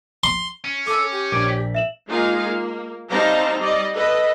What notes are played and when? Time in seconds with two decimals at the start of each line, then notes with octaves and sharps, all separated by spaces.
0.24 C6
0.65 C#4
0.87 A4 D6
1.12 G4
1.32 A#1 D4 D6 G#6 D7
1.49 B6
1.75 E5 E7 F#7
2.07 G#3 A#3 D#4 F4 G#4 F5
2.43 A#3
3.10 G3 C4 D#4 F5 A5 A#5
3.58 G3 D5 D#5
3.92 A4 B4 D#5